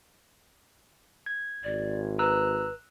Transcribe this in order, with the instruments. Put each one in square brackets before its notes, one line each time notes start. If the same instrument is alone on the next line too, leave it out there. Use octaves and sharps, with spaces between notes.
[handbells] G#6
[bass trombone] G#1 [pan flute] D5
[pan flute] B4 [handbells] A#5 E6 F#6